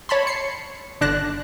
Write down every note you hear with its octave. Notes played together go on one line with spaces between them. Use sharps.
C#5 A5 B5 C6
C7 C#7
G1 D3 D4 A5 F#6 A#6